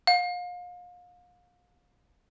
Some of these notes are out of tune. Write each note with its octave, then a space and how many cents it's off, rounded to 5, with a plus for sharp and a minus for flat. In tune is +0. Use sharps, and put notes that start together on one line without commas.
F5 +35